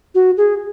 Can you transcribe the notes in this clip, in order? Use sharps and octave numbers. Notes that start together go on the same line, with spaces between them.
F#4
G#4